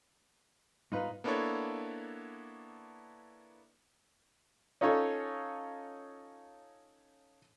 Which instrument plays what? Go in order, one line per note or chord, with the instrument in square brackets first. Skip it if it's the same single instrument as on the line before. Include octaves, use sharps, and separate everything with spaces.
[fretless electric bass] G#2 G3 B3 [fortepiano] D#4 F4 B4
[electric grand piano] A#3 B3 D4 E4 A4 C#5
[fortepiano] C#4 D#4 F4 A4 C#5